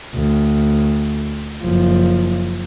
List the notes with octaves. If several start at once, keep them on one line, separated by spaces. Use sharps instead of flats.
D2
F#1 F3